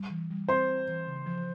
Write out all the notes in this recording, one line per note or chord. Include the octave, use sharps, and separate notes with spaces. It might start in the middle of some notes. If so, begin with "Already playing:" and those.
Already playing: G3
E3
G3
C4 C5 C6
C4
E3
C#3
F3